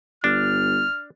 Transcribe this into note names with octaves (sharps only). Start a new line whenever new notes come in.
G1 D4 F6